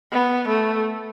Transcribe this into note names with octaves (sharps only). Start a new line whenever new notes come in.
B3
A3